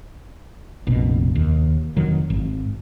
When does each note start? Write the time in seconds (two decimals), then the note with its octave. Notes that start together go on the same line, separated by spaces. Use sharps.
0.87 F1 A#1 B2
1.35 D#2
1.97 F1 D#3 F#3
2.30 G#1